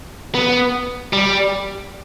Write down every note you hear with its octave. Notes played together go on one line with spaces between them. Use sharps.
B3
G3